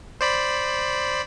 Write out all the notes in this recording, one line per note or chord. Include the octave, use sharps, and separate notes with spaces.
C5 D5 B5